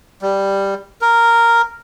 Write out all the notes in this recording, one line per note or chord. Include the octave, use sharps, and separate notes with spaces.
G3
A#4